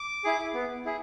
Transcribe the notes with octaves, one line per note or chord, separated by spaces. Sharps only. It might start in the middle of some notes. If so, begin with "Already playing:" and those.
Already playing: D6
E4 G#4
B3
E4 G#4